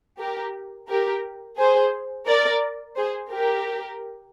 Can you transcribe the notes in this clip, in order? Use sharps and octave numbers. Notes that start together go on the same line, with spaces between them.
G4 A#4
G4 A#4
G#4 C5
A#4 D5
G#4 C5
G4 A#4